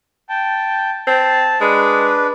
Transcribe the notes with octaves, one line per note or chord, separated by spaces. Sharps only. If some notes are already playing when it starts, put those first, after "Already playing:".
G5 A5
C4 A5
G#3 D4 B4